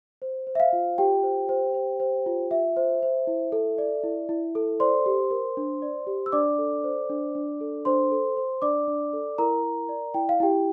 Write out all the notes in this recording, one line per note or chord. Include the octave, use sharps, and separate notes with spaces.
C5
C5
E5
F5
F4
F4 G4 G5
C5
C5
C5
C5
F4
F4 E5
C5
C5
E4
A4
D5
E4
E4
A4
C5 D5 C6
G4
A#4
D4
D5
G4
E6
D4 D5 D6
A4
C5
D4
D4
A4
D4 C5 C6
A4
C5
D4 D5 D6
D4
A4
E4 A#4 A#5
A#4
D5
E4 G5
F5
E4 G4 G5